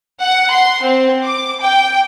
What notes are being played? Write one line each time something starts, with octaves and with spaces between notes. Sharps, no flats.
F#5
C6
C4
D6
G5